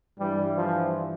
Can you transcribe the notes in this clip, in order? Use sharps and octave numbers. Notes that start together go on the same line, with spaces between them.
G2 E3 G3
F3